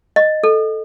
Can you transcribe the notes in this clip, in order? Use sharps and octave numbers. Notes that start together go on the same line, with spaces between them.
D#5
A4